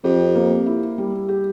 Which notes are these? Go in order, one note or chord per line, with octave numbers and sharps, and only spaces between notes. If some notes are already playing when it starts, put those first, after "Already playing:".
F2 G4
A#3
E4
G3
G4